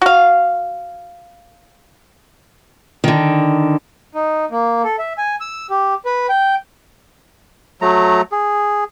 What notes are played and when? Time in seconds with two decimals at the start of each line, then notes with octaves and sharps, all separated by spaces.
0.01 F#4 F5
3.04 D3 D#3
4.14 D#4
4.51 A#3
4.84 A4
4.99 E5
5.18 G#5
5.40 E6
5.70 G4
6.06 B4
6.29 G5
7.81 F#3 A3 A#5
8.32 G#4